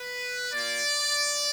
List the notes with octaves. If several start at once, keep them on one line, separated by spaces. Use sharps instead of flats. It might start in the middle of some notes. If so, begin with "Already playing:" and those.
Already playing: B4
A#3 F4 D5